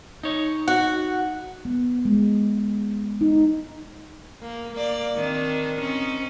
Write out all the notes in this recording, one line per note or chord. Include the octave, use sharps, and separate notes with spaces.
D#4 C#5
F#4 F#5
B3
G#3
D#4
A#3
A#3 D5
D#3 C4 D4
C4 C#4 D#4